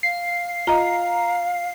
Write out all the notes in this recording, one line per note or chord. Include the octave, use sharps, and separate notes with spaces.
F5 C7
F4 D#5 F5 A#5